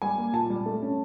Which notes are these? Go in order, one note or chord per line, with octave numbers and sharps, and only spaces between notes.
G3 G#5
A#3
A#2 A5
G3
A3
C#4